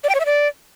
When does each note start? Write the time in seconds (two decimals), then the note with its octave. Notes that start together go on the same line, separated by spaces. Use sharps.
0.04 D5
0.09 G5
0.15 C#5
0.20 E5
0.26 D5